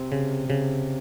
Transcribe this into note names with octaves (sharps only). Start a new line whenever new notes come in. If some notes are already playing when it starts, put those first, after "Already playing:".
Already playing: C3 C4
C#3
C#3